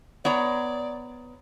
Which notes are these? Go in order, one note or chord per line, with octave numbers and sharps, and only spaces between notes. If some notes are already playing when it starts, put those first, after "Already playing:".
B3 C#5 D5 A#5